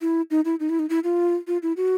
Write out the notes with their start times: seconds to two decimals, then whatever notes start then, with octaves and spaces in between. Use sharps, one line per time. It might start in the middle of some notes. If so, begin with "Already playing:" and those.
0.01 E4
0.31 D#4
0.45 E4
0.60 D#4
0.70 E4
0.79 D#4
0.89 E4
1.04 F4
1.47 F4
1.63 E4
1.77 F#4